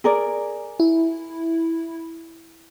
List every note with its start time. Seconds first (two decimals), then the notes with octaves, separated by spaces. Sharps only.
0.04 G#4 A#4 D5
0.80 E4